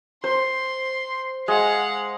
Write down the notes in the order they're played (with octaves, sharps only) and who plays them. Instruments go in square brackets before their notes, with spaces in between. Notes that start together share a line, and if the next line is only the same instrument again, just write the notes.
[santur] C5 [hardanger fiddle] C6
[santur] G#3 [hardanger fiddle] F5 F#5